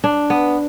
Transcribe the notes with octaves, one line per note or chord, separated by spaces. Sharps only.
D4
B3